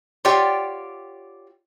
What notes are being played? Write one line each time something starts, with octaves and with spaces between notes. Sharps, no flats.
F4 G4 C#5 D5 F#5 G5